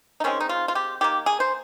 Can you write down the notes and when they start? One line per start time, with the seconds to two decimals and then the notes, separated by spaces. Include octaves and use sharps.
0.20 D#4
0.24 D#3 G#3 C4 C#4
0.40 D#4
0.49 F4
0.68 F4
0.75 G4
1.01 D#3 A#3 G4
1.26 G#4
1.40 C5